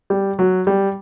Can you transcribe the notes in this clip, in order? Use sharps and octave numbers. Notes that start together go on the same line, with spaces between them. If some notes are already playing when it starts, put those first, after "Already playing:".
G3
F#3
G3